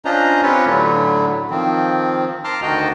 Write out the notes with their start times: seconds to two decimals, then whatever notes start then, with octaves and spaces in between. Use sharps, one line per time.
0.05 C#4 D4 F4 C5 D#5 A#5
0.43 C4 C#4 F4 G4 B4 C#5
0.66 A2 D3 F#3 A3
1.50 D#3 F3 C4
2.44 A5 A#5 C6 D6 F6
2.62 D2 D#3 F#4 D#5 G5 A5